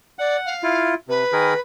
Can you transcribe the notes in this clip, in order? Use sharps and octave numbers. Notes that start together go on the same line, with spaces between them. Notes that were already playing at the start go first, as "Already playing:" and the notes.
D5 F#5
F5
E4 F4
C3 B4
D#3 G#4 A#4